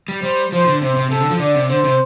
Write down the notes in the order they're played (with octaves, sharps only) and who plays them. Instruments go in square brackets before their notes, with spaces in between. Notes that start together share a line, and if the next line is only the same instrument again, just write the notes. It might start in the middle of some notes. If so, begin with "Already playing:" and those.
[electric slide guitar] G3
[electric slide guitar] G3 [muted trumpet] C5
[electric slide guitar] F3 [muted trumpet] C5
[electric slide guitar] D3
[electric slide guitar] C3 [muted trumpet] C5
[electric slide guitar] C3
[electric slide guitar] C3 [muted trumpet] A4
[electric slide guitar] D3
F3
[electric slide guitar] D3 [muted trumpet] D5
[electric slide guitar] C3
[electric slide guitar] D3 [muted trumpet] C5
[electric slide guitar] C3